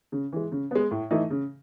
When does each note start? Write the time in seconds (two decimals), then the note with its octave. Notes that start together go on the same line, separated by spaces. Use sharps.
0.12 C#3
0.32 E3 G#3
0.52 C#3
0.71 G#3 B3
0.91 A2
1.11 E3 A3 D#4
1.30 C#3